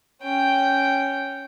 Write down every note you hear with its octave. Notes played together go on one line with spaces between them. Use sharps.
C#4 G5